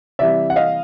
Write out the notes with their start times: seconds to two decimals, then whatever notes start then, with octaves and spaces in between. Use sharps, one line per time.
0.19 C3 E3 G3 D5 E5
0.50 F#5
0.56 D#5 F5